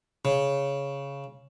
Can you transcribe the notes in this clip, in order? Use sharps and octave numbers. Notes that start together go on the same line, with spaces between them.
C#3